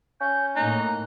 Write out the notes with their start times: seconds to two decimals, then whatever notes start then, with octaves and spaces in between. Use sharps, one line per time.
0.20 C#4 G6
0.56 A2 A#3 D#4 F#6